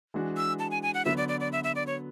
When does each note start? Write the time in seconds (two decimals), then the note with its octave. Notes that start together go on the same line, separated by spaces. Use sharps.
0.14 E3 G#3 D4 F#4
0.37 E6
0.59 A5
0.71 G#5
0.83 G#5
0.94 F#5
1.05 D3 F#3 B3 E5
1.17 D5
1.28 D5
1.40 D5
1.52 E5
1.64 E5
1.75 D5
1.87 C#5